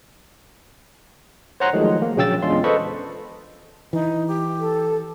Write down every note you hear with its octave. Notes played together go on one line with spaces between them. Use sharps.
C5 C#5 F#5 A#5 C6 F#6
D#3 F3 F#3 G#3 A3
A#3
A#1 C#3 F#3 G5 E6 A6
E2 G#3 C#4 D4 F4 C6
A4 B4 C5 D#5 B5 C#6
E3 D#4
G4
A4